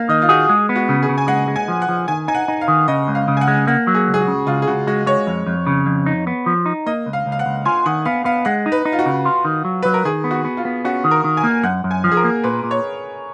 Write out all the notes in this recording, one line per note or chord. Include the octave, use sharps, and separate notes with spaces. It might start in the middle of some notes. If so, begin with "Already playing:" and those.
Already playing: A#3 F5
D#3 D#5
F4
F#4 G#4
G#3
B3
F#4
C#3
G#4
C#3
G#5
G#3 F#5
G#3
G#5
F3
F#5
F3
D#3 G#5
D#4 G#5
F#5
D#4
F5
D#3
C#3 D#5
C#2
F5
C#3
G#5
F#5
G#3
A#3 F#5
F#3
G#4
C#2
G#4
F#4
C#3
C#2 F4
G#4
C#2 F#4
G#3 F#4
G#3 C#5
F2
F2
C#3
F2
D#4
B3
F3
D#4
A#3 D#5
C#2
F5
C#2
F5
F#5
C#2
F4 G#5
D#3 F#5
B3 F5
B3 F5
G#3 F#5
D#4
B4
D#4
F4
F#4
C#3
F4
D#3
F#3
F#3 B4
A#4
D#3 G#4
B3
F#4
B3
F4
B3
C#4 F#4
D#3
A#4
D#3
G#5
A#3
F#2 F#5
F#2
G#5
F3
G#4
A#4
A#3
A#2 B4
A#2
C#5